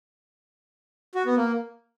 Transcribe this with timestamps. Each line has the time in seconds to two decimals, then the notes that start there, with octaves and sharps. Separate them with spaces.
1.15 F#4
1.26 B3
1.37 A#3